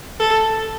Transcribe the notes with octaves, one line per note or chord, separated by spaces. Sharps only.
A4